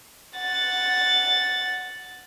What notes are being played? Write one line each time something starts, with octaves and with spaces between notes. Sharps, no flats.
F#5 A6